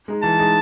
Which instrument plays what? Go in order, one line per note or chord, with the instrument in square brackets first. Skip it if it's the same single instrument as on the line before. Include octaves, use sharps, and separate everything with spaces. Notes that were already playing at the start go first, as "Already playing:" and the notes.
[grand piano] G#3 D#4 G#4
[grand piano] E3 [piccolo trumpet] A5
[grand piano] G#3 D#4 G#4